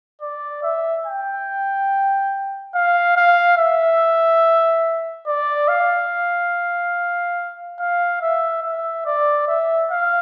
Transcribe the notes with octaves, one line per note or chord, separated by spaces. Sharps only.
D5
E5
G5
F5
F5
E5
D5
F5
F5
E5
E5
D5
E5
F5